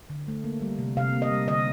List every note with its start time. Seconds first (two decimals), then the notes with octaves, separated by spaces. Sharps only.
0.10 D3
0.28 A3
0.44 A#3
0.61 G3
0.79 C3
0.97 C3 F5
1.13 A#3
1.22 D#5
1.31 G3
1.48 D3 D#5